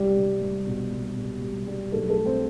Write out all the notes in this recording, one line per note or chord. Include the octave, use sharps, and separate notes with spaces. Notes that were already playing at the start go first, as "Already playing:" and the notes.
Already playing: C2 G3 G4
C2
C2
B2
C2
B2
C2
G3
B1 A3 A4
A3 A4
G3
C4 C5